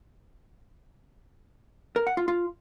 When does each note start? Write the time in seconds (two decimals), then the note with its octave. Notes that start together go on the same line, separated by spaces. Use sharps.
1.96 A#4
2.07 F#5
2.17 F4
2.28 F4